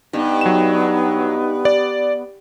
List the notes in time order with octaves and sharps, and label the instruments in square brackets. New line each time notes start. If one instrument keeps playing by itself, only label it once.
[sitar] G2 [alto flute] B3 [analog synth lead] D#4
[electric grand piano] F#3 E7
D5